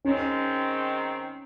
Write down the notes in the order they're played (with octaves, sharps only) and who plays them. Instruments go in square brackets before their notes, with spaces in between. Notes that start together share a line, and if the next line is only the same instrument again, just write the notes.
[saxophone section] D#3 G#3 C4 [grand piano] C#4